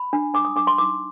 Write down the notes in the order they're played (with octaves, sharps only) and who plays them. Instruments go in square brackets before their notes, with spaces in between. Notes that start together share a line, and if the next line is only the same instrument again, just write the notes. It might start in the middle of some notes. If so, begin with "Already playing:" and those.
Already playing: [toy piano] B5
D4
D4 D6
D#6
D4 D6
C6
D#4 D6